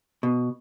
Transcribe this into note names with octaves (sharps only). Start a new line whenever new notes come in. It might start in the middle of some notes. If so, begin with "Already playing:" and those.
B2